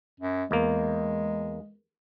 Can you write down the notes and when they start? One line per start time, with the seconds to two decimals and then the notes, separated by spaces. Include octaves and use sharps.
0.20 F#2
0.51 E2 G#3 A#3